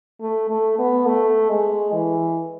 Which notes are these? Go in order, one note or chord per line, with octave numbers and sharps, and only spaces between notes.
A3
A3
B3
A3
G#3
E3